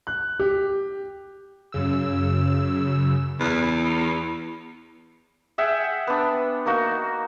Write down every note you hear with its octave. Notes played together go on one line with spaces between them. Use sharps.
F#6
G4
F#2 C#3 E6
E2
G#4 E5 F#5 G5
B3 D4
A#3 D#4 F#4